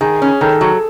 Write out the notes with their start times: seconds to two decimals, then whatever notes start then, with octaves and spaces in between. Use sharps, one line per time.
0.01 D#3 G#4
0.22 C#4
0.41 D#3 A4
0.61 F#3